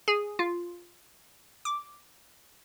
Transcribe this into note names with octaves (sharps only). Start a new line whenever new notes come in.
G#4
F4
D6